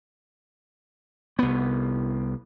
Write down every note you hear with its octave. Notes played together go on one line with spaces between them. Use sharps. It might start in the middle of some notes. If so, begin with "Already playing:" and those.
C2 B3